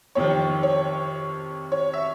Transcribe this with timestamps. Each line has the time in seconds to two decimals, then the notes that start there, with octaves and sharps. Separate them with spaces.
0.15 F2 C3 D#3 C#5
0.63 C#5
1.72 C#5
1.94 E5